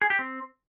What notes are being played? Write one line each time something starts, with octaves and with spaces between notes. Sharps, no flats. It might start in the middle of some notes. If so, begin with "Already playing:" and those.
G#4
G4
C4